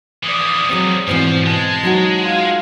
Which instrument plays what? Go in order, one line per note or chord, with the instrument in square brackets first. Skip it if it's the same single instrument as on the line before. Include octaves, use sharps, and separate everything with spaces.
[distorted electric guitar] E3 F3 [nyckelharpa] D5 D#6
[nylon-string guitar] F#3 G#3 C4
[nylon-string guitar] G#2 B2 E3 [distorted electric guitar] F3 [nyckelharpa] C4
[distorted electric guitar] G#3 [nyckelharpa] A5
[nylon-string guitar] F#3 D#4 F#4
[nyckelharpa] F4 F5